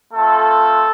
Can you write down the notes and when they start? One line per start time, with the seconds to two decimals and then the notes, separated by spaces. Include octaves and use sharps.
0.14 A3 C4 F4 A4